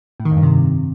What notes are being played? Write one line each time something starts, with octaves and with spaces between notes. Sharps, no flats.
A2
D#3
F2
G2
C3